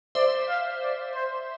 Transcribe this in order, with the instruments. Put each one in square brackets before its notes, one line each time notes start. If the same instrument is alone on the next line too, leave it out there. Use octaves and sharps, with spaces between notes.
[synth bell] C5 E5 [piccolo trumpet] D5
[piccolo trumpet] F5
D5
C5